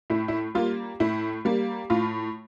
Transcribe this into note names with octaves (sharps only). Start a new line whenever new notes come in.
A2 E4
E4
G3 A#3 F4
A2 E4
G3 A#3
A2 F4